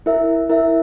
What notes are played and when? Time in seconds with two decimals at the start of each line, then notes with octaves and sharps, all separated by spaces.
0.06 E4 A#4 E5
0.50 E4 A#4 E5